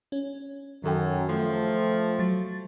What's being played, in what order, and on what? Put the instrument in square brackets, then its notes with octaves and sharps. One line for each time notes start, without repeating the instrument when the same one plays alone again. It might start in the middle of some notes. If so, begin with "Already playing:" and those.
[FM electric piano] C#4
[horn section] F#2 [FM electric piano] D#3 A4 G5
[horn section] F3 A3
[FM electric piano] F#3 A6